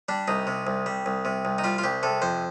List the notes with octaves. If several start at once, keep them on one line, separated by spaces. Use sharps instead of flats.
G3 D4
C2 D#4
C3
C2
G3
C2
C3
C2
D#4
G3 F4
F4
C2 G4
C3 A4
F2 C5